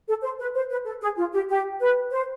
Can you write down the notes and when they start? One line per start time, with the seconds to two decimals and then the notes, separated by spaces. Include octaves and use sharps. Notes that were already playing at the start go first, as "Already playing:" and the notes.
0.08 A4
0.23 C5
0.39 B4
0.55 C5
0.70 B4
0.85 A4
1.01 G#4
1.17 F4
1.33 G4
1.49 G4
1.80 B4
2.11 C5